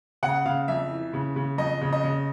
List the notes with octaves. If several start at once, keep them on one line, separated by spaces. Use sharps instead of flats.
C#3 F#5
C#3 F5
F2 E5
E3
C#3
C#3
F2 D#5
C#3
D#5
C#3